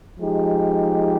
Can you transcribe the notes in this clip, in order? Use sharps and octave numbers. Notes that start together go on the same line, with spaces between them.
F3 G#3 D#4 G4